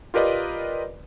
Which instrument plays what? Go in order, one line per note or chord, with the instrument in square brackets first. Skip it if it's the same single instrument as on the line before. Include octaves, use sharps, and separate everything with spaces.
[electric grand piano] F4 G4 A#4 B4 D5 D#5